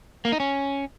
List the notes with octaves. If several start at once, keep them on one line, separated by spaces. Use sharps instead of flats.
A#3
D#4
C#4